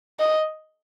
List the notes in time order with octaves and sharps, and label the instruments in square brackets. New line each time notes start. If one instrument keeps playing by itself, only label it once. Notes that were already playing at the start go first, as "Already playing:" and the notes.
[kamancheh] D#5